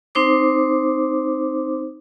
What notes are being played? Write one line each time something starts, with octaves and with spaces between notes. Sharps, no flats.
C4 D#4 C5 D6